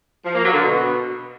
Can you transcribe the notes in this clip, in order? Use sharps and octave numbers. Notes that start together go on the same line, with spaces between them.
F3
A#3
F#3
D3
B2